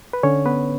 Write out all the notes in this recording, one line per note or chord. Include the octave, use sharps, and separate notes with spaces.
B4
D3 C#4 C#5
B3 B4